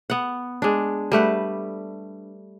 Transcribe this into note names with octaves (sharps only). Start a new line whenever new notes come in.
B3 F#5
G#3 D4
G3 A3 B4 F#5